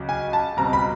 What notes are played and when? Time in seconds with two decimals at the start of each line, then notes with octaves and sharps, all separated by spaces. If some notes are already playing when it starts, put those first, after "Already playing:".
Already playing: C#2 C#3 F#3
0.09 G#5
0.33 A5
0.57 C#2 B2 G3 C4 A#5
0.73 B5